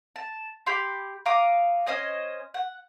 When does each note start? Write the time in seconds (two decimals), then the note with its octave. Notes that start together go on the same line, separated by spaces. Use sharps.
0.16 A5
0.66 G4 B5 C6 D6
1.26 F5 A#5 D6 D#6
1.87 C#4 C5 D#5 G#5
2.54 F#5